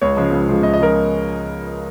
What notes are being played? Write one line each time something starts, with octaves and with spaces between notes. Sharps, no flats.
C#2 C#5
C#3 F3 G#3
C#2
C#3 F3 G#3
C#2 D#5
D#5
C#3 F3 G#3 A#4